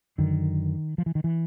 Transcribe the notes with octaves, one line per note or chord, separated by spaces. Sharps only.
F#2 D3 D#3
F3
E3
D#3
E3